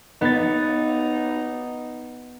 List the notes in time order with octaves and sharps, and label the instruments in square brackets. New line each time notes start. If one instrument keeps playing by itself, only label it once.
[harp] B3 A6 [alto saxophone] D#4